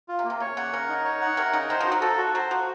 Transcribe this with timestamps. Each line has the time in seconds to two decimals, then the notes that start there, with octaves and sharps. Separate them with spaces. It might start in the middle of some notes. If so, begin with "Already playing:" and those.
0.09 F4
0.19 C3
0.25 A#3
0.30 C3
0.40 C#3 C#5
0.57 C#3 F#5
0.73 C#3 A#4
0.89 D#4
1.05 C#5
1.21 F#5
1.37 C3 A#4
1.53 C#3 D#4
1.70 D#3 C5
1.80 F3
1.86 F#4
1.92 F#3
2.01 F3 A4
2.18 F#4
2.35 F#3 C5
2.51 F3 F#4